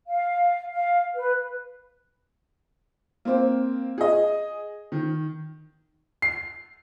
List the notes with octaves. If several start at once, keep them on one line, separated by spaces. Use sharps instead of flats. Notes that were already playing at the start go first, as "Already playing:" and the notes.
F5
F5
B4
A#3 C4
G#4 D#5
D#3
C7